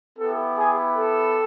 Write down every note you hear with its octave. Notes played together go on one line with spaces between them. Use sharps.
B3 E4 G4 A4
G#4
A4